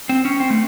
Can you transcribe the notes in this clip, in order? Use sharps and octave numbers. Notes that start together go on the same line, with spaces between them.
C4
C#4
C4
A3